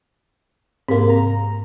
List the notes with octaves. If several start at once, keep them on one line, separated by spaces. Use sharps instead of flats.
G#2 C3 A#3
A#5